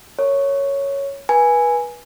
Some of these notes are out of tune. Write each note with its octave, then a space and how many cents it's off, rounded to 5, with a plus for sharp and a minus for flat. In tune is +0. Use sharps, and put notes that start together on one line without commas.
A#4 -30 C#5 +0
B4 -30 G#5 +0